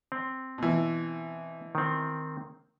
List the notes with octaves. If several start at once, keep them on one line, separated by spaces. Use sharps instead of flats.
C4
B2 E3
D#3 C4